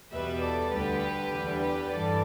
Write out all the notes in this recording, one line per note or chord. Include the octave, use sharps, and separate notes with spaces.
E2 B2 G3 B4 E5
A4 D5
D2 D3 G3 G4 B4
E2 D3 G3
G4 B4
G2 E3 G3 A4 D5